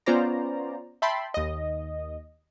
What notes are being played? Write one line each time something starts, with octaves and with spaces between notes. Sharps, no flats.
B3 C#4 F4 C5 D5 A#5
E5 G5 A5 B5 C6
D#2 D#5